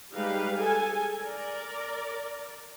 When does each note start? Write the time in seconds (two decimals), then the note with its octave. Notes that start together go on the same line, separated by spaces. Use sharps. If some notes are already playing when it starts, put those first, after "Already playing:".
0.12 G3 G#3 D#4 G4 B4 F5
0.55 G#4 A4 G#5
1.20 A#4 D5